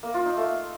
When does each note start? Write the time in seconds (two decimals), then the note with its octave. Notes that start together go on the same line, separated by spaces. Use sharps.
0.03 A#3
0.14 F4
0.25 D#4
0.37 A3